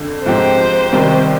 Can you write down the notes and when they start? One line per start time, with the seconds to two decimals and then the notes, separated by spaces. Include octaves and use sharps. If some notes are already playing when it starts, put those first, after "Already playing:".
Already playing: F2 D3
0.26 G#2 F3 C4 G4 C5
0.93 C2 C3 D#3 G3